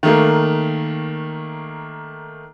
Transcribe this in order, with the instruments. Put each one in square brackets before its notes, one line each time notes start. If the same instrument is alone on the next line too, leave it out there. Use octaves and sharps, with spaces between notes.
[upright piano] D#3 A3 A#3